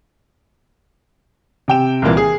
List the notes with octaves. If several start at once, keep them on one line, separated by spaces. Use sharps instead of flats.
C3 G5 E7
C2 A#2 E3 A#3
G#4